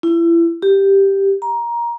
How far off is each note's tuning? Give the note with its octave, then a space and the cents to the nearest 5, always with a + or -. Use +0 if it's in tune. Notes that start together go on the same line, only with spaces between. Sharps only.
E4 +30
G4 +0
A#5 +15